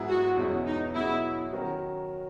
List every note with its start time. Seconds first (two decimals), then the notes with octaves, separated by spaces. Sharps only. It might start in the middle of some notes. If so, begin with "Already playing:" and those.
Already playing: G#2 F#3 B3 E4 G#4
0.09 F#4
0.37 E2 B2 G#3 C#4 E4
0.66 D#4
0.95 B2 F#3 C#4 E4 G#4
1.53 D#3 F#3 C#4 F#4 A#4